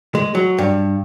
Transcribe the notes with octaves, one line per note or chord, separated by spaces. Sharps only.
G#3
F#3
G2